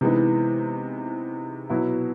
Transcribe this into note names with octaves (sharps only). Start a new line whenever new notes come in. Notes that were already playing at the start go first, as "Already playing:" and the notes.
C3 E3 G#3 B3 D#4
B2 F#3 B3 E4